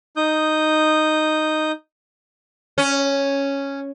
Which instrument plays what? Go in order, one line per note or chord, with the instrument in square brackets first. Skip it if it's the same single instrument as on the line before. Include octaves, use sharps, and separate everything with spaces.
[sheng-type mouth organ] D#4 D#6 G6
[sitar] C#4